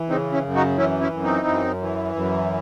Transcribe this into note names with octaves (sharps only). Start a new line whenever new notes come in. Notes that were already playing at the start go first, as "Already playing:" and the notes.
Already playing: E3
C#3 C4 D#4
C#4 E4
F#2
D#4 F#4
E3 C#4 E4
C#4 E4
F#2
C4 D#4
F#2
E3
F#2